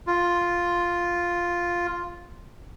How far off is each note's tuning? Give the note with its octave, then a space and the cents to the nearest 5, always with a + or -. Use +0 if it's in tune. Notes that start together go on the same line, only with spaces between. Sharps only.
F4 +0